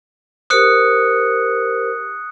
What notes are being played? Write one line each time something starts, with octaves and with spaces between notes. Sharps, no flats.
G4 A#4 C5 D#6 F#6 C#7